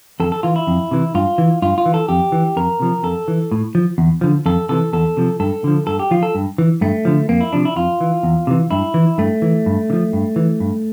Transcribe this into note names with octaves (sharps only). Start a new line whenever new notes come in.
F2 A4
A4
E3 F4
E4
F2
C3 E3
G2 F4
E3
G2 F4
F4
E3
A4
F2 G4
E3
F2 A#4
C3 F3
F2 A4
E3
A2
F3
E2
D3 F3
F2 A4
C3 E3 A4
E2 A4
C3 F3
G2 A4
D3 F3
G2 A4
G4
F3 F4
A4
G2
E3
G2 A3
D3 F3
F2 A#3
E4
C3 F3 D4
E4
F2 F4
E3
E2
C3 E3
G2 E4
E3
G2 A3
E3
G2
D3
F3
G2
E3
G2